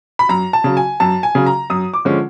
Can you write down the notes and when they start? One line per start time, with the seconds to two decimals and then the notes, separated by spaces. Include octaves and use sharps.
0.19 B5
0.29 F#2 A#5
0.53 A5
0.64 C#3 F#3
0.77 G#5
1.00 F#2 A5
1.23 G#5
1.35 C#3 F#3
1.46 A#5
1.70 F#2 D#6
1.94 D6
2.05 D3 F3 G#3 C#4